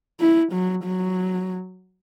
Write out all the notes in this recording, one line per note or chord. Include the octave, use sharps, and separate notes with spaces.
E4
F#3
F#3